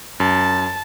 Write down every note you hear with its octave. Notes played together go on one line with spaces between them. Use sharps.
F#2 A5